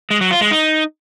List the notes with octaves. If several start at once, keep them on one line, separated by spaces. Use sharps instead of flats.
G#3
F#3
F4
G#3
D#4